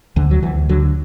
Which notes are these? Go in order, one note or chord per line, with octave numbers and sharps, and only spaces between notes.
D2 D3
F#3
D2 E3
D3 F#3